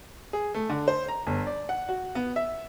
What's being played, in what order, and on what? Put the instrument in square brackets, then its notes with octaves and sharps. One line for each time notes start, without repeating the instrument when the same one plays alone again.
[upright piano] G#4
A3
D3
C5
A#5
G1
D5
F#5
F#4
B3
E5